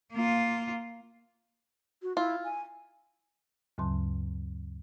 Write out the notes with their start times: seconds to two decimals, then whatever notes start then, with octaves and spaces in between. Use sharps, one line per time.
0.13 A#3 F4
2.02 F#4
2.17 E4 F4
2.44 G#5
3.78 D2 G2 C#3 F#3 A5 C6